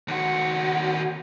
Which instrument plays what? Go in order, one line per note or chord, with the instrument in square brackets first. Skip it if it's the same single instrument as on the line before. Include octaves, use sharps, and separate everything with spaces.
[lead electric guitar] D#2 F#4